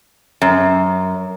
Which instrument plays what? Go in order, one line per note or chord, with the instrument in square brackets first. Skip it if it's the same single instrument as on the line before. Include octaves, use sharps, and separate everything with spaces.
[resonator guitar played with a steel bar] F#2